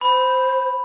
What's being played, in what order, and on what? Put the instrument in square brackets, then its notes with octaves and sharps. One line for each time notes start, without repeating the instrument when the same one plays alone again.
[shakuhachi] C5 [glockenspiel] B5